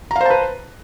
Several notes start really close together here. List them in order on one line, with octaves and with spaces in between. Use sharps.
A#5 F5 C5 A5 B4